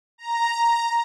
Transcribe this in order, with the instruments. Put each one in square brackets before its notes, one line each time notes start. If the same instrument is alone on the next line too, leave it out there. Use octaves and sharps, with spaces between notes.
[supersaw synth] A#5